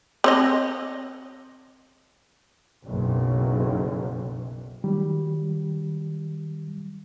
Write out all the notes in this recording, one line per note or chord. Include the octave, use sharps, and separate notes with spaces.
C4 C#5 D#5
F#1 B1
D#3 F#3 G3